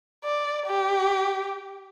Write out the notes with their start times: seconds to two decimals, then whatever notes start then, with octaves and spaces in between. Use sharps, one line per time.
0.24 D5
0.66 G4